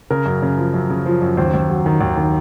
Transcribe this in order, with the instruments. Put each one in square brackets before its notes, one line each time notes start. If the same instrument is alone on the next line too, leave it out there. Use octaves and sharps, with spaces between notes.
[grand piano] C#3 A#4
F#2
C#3
F3
F#2
C#3
F3
F#2
D#2 C5
D#2
F#3
D#3
D#2
D#3